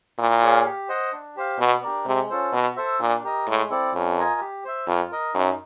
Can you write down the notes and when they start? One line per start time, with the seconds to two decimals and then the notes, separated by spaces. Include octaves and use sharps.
0.19 A#2 E4
0.42 G#4 C#5 F5
0.65 G4
0.89 C5 D#5 F#5
1.13 D4
1.36 G4 C5 F5
1.59 B2 B3
1.82 D4 G4 A#4 D5
2.06 C3 G#3
2.30 C#4 F4 A4 C5
2.53 B2 F#4
2.76 A4 C5 E5
3.00 A#2 D4
3.23 G4 A#4 D#5
3.47 A2 G#3
3.70 C4 E4 A4 D5
3.94 F2 C#4
4.17 F4 A#4 D#5 G#5
4.41 G4
4.64 C5 E5
4.87 F2 F4
5.11 A#4 D#5
5.34 F#2 D#4